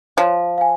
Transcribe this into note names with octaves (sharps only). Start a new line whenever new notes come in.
F3 C#5
F5 G#5